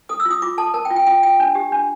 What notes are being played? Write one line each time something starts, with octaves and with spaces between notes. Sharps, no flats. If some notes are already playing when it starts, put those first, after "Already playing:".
A4 D#6
E6
F4
D#6
F4 D6
A4 A5
A#4 A5
G5
F4
G5
F4 G5
F4 G5
D4
G4
D4